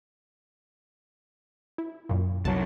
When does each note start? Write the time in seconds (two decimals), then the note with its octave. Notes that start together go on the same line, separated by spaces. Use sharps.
1.78 E4
2.09 F#2 A#2
2.45 C2 F#3 A5